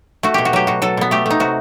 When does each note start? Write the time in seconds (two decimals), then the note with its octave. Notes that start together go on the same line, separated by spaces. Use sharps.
0.23 A3 F#4
0.34 B2 G4
0.45 F#4
0.53 F#3 G4
0.67 B2 F#4
0.82 F#3 A4
0.97 B2 B3
1.11 A3 G4
1.26 A3 D#4
1.40 C3 F#4